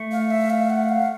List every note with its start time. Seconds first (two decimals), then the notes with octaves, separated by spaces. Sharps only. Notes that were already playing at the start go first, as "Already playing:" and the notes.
Already playing: A3
0.12 F5
0.31 E5
0.50 F5
0.70 F#5
0.89 F5